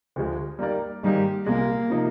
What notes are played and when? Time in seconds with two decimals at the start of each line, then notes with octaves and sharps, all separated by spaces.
0.16 D2 D3 F3 G#3
0.59 G3 A#3 D#4 A#4 D5
1.03 G#2 D#3 G3 A#3 D#4 G4
1.46 C2 A#2 G#3 A#3
1.90 C3 F3 A#3 D#4